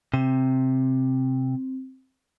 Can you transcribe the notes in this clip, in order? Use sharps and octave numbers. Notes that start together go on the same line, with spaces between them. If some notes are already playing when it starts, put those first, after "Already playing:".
C3 C4